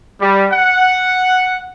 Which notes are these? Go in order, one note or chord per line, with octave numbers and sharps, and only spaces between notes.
G3
F#5